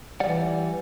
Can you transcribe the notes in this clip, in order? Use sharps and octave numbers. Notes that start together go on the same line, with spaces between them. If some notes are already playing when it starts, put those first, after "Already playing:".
E3 G3 D5 F#5